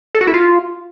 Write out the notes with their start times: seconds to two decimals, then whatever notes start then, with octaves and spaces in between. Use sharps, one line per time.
0.15 A4
0.21 F#4
0.27 E4
0.34 F4